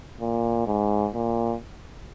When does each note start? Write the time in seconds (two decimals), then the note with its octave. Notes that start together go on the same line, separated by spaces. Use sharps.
0.20 A#2
0.67 G#2
1.14 A#2